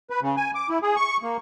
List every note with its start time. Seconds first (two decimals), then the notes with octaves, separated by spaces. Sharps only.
0.10 B4
0.22 C#3
0.37 G#5
0.55 D6
0.69 E4
0.82 G#4
0.96 C#6
1.23 A#3